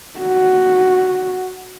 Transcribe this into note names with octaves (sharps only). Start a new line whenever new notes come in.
F#4